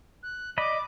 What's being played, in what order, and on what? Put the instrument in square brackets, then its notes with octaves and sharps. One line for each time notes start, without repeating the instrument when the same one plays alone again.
[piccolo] F#6
[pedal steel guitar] D5 D#5 B5 [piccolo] D6